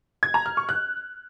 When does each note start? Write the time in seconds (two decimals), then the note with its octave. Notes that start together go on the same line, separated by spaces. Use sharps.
0.23 G#6
0.34 A#5
0.46 F6
0.57 C#6
0.69 F#6